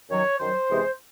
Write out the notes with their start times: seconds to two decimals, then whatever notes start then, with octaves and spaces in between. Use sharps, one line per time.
0.10 F#2 D#3 F#3 C#5
0.40 F#2 D#3 F#3 C5
0.69 E2 C3 E3 G#3